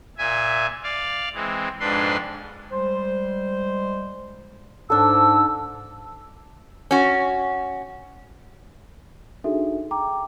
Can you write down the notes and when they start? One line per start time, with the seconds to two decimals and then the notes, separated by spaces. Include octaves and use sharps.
0.18 A#2 E5 G#5
0.83 D5 F5
1.34 E3 G#3 C4
1.80 F2 G#2 D4 B4 C6
2.72 G3 G#3 C5
4.90 G#2 D4 A4 E6
6.91 C#4 F#4
9.44 D4 D#4 F#4 G#4 A4 E5
9.91 G5 A#5 D6